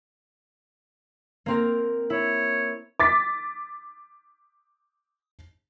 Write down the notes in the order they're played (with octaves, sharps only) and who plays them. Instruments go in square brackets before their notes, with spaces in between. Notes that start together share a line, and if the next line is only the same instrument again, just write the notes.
[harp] A#3 C4 A#4
[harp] E4 [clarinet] C#5
[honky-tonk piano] D6 A6 B6